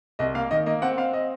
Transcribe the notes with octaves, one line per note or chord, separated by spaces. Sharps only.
C2 D#5
A#3 F5
D#3 D#5
A#3 D#5
C4 F#5
C4 F5
D#5